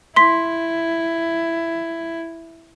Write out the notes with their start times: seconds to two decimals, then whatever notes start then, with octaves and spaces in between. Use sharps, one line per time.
0.16 E4 C6 B6